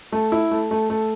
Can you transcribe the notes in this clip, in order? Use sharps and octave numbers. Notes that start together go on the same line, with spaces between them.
A3
E4
A3
A3
A3